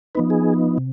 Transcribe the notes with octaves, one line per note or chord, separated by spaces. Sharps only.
F3 B3 D#4 B4
G#4
C3